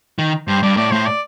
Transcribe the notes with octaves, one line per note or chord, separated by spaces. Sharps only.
D#3
G2 C5
G2 D5
A2 D5
A2 C5
D5